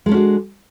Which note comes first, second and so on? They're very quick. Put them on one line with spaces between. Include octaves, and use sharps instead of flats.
G#3 A4 C#4 F#4 D4